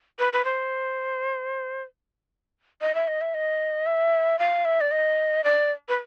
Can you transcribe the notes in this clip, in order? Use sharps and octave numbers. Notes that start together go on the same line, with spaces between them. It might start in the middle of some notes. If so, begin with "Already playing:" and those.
B4
B4
C5
D#5
E5
D#5
E5
D#5
E5
F5
E5
D5
D#5
D5
B4